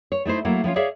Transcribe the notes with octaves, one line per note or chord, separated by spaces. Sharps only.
C#5
A3 D#4 E4 C5
F#3 A3 A#3 E4
F3 B3 C#4 F4
G#4 C#5 D5 E5 F5